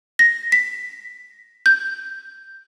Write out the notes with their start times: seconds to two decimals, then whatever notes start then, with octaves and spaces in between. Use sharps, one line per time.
0.19 A#6
0.52 B6
1.66 G6